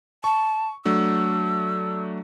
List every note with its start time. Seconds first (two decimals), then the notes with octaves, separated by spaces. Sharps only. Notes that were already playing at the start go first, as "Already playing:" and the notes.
0.24 A5 C#6
0.85 F#3 A3 D4 E6